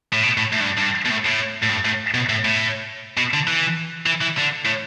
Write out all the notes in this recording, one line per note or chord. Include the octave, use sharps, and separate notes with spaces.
A2
B2
A2
A2
G2
G2
B2
A2
A2
A2
G2
A2
B2
A2
A2
B2
D3
E3
E3
E3
D3
A2